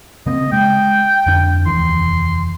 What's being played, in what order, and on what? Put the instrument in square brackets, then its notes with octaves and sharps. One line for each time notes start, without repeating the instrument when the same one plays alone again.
[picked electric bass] C#3 A#3 C4 [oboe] D#5
[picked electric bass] G#3 [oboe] G5
[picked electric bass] F2 D3 D4
[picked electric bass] F1 D#2 E3 [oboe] C6